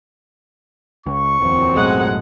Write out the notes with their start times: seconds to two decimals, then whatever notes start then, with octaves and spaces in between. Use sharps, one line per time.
1.06 C#2 C#6
1.41 D1 E2 A#2 F#3 C4
1.76 B1 F#2 A2 G#3 F#5